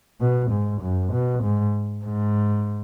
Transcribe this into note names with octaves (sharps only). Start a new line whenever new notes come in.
B2
G#2
F#2
B2
G#2
G#2